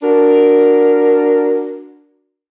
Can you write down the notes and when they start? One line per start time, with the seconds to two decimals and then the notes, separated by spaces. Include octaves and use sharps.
0.03 D4 F#4 A#4